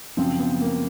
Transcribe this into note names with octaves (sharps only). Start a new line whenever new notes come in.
F#2 C#3 F3 C4
B3
A#3